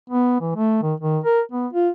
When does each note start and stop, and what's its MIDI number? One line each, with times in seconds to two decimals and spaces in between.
0.10 0.40 59
0.41 0.55 52
0.56 0.81 57
0.83 0.94 51
1.00 1.19 51
1.24 1.41 70
1.52 1.67 59
1.73 1.89 65